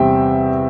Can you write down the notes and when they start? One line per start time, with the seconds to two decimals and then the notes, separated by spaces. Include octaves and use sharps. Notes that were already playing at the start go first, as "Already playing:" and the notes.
Already playing: E2 C3 G3 C4 E5 G5